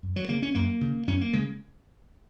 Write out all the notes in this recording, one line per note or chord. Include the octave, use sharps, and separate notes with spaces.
F#2
F#3
C#3 A#3
C#4
F#2 A#3
C#3
F#2 C#4
A#3
C#3 G#3